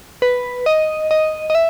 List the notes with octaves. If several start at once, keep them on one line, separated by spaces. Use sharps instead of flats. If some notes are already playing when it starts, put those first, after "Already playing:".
B4
D#5
D#5
D#5
E5